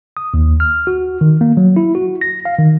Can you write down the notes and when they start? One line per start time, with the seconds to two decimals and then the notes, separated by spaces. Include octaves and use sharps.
0.17 D#6
0.34 D#2
0.60 F6
0.87 F#4
1.21 D#3
1.41 A#3
1.57 F#3
1.76 E4
1.95 F#4
2.21 A#6
2.45 F5
2.59 D#3